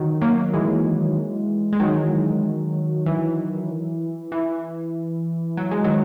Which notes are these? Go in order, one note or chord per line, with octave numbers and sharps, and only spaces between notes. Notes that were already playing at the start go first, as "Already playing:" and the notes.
Already playing: D#3 F#3
F#3 A#3
E3 G#3
G#3
D#3 F#3
E3
E3
F#3
G#3
D#3 F#3